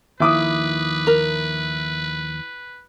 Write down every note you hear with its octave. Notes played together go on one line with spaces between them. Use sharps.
D#2 D#3 F3 E4 B4 D6 D#6
A#4